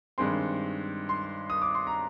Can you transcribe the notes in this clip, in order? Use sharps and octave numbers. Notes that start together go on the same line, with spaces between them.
G2 D#3 G#3 C4 C6
C6
D#6
D6
C6
A#5